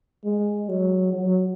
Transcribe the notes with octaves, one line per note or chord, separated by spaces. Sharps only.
G#3
F#3
F#3